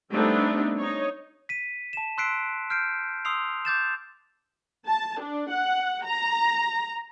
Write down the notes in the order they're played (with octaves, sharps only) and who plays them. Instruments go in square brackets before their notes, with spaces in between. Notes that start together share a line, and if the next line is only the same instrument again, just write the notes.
[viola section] G3 A3 B3 C4 D4 D#4
D#4 C#5
[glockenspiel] B6 D#7
A5 E7
C6 E6 F#6 B6 C7 D7
F6 G6 C7 D7
C6 D#6 E6 C7 F7
D6 G6 A6 E7
[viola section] A5
D4
F#5
A#5